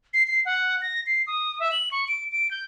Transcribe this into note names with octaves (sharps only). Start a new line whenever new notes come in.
C7
C7
F#5
A#6
C7
D#6
E5
F#7
C#6
D7
D7
G6